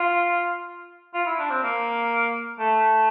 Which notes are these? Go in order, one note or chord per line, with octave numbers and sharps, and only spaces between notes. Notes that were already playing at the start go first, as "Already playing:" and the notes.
Already playing: F4
F4
E4
D4
C4
A#3
A3